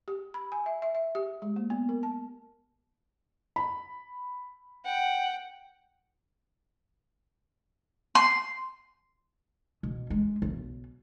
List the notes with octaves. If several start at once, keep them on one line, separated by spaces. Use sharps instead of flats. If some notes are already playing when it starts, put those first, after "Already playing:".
G4
B5
G#5
E5
E5
E5
G4
G#3
A#3
B3
A#4
A5
B5
F#5 G5
C6
B2
G#3
B1